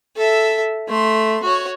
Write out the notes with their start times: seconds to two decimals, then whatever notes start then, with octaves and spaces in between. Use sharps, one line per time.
0.16 A4 E5
0.88 A3 C6
1.43 F#4 C#5